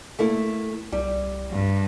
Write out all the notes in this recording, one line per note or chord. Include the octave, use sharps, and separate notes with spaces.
A3 A#3 E4
C2 G3
G2